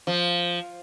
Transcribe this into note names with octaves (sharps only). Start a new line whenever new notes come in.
F3